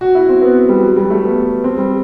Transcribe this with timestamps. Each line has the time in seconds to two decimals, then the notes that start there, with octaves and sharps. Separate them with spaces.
0.01 F#4
0.15 E4
0.29 C4
0.42 B3
0.69 G3
0.82 F#3
0.96 G3
1.10 A3
1.24 B3
1.64 C4
1.78 G3